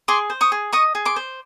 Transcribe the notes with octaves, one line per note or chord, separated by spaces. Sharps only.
G#4 C6 D6
C5
C#6 D#6
G#4
D#5 C#6 D#6
G#4
C6 D6
C5